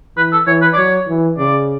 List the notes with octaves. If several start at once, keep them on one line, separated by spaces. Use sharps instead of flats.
E3 B4
A4
E3 C#5
B4
D5
F#3 C#5
E3
C#3 D5